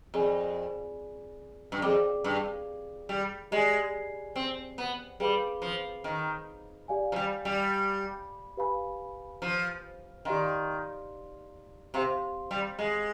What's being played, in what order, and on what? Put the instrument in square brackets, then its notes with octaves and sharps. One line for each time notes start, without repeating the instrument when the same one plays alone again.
[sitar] F2 [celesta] G#4 D5 G#5 B5
[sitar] G2
[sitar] F2 [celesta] G#4 D5 G5 D6
[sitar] G2
G3
[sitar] G#3 [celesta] G4 D5 G#5
[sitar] C4
B3
[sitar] G3 [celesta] G#4 B4 F5 B5 D6
[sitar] F3
D#3
[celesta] G4 D5 F5 G#5
[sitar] F3
G3
G3
[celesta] G4 B4 F5 G#5 B5
[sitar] F3
[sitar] D#3 [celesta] G4 D5 F5 C6
[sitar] C3 [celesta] G4 C5 F5 C6
[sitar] G3
G#3